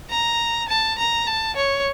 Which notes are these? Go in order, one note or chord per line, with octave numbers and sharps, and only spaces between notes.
A#5
A5
A#5
A5
C#5